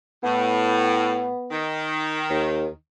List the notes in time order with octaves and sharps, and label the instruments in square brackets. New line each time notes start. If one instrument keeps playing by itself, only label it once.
[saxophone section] A2 [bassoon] B3
[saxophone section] D#3
[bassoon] D#2